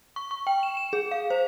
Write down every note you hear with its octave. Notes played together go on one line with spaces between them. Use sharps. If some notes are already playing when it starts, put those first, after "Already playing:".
C#6
C#6
G5
E7
E7
G#4
F5
C5